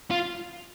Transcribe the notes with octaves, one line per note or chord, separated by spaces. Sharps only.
F4